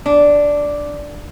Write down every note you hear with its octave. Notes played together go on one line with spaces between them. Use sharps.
D4